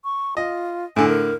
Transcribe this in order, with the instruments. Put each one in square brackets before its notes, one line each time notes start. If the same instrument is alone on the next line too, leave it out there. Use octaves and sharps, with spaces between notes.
[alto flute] C#6
[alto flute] F4 [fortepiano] D#5
[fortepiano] A2 D3 [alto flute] G#5
[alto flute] A#4